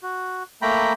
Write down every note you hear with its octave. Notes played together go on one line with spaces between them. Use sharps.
F#4
A3 A#3 G5 A#5 B5